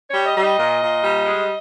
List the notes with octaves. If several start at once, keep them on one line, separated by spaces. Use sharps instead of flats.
G3 C#5
D#5
G3
D#5
A#2
A#2
G3
G#3